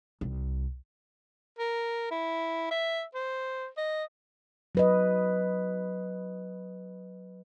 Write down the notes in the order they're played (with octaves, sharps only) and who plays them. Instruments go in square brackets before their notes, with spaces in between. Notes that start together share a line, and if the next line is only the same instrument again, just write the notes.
[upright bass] C2
[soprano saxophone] A#4
E4
E5
C5
D#5
[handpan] F#3 B4 D#5